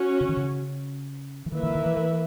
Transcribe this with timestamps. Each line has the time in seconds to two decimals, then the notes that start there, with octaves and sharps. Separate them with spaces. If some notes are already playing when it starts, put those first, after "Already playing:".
Already playing: C#4 F#4 C#5
0.21 C#3
0.29 D#3
0.37 C#3
1.46 E3
1.52 D#3 A#3 E4 B4 E5
1.63 D#3
1.70 E3
1.75 D#3
1.86 E3
1.97 E3